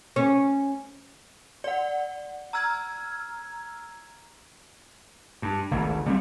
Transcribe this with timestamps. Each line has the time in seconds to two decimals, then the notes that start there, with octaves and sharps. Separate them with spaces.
0.16 C#4
1.64 D5 F#5
2.53 A#5 E6 F6 G#6
5.42 G2
5.71 G#1 D2 G#2
6.06 G3 B3 C4